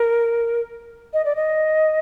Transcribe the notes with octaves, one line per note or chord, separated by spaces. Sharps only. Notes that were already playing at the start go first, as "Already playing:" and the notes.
Already playing: A#4
D#5
D5
D#5